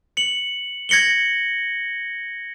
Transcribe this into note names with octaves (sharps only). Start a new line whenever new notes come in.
C#7 F#7
G#6 A#6 C#7 F#7 G7